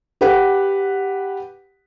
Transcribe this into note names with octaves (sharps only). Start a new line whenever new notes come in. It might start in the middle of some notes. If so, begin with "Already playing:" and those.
G4 B4 F#5